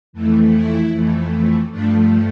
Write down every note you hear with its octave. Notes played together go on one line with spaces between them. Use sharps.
F2 E3 A3
E4
F2 E3 A3
G2 F3 A3 D4